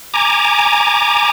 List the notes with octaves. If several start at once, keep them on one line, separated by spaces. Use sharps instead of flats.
G#5 A#5 D6